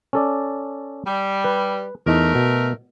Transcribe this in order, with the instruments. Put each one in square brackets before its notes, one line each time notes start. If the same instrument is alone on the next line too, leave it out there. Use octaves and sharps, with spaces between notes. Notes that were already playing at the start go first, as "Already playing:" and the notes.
[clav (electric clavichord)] C#4 A4 D5
[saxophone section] G3
[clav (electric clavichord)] B4
[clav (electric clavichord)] E2 D#4 [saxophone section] A3 A#4
[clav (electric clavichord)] B2